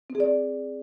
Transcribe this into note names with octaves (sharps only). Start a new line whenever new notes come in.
C4
G#4
D5